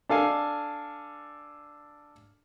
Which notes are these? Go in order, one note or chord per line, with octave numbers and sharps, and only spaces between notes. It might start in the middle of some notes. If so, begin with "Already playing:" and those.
D4 A4 F5 G#5